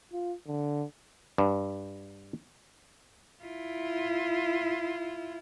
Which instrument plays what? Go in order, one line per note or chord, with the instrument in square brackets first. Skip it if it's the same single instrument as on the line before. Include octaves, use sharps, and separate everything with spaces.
[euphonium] F4
D3
[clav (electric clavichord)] G2
[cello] E4 F4